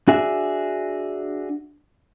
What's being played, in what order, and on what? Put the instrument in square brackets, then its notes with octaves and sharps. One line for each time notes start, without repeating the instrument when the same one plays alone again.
[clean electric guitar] D4 F#4 G#4 E5